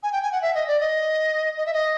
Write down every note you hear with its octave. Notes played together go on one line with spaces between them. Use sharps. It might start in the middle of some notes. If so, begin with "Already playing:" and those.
G#5
G5
G#5
F#5
E5
D#5
D5
D#5
D#5
E5
D#5